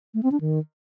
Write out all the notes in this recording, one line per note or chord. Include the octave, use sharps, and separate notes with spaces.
A3
C4
D4
D#3